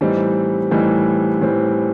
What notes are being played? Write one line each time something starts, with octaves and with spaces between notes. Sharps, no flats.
A2 E3 G3 C4 D#4
A2 E3 G3 C4 D#4
A2 E3 G3 C4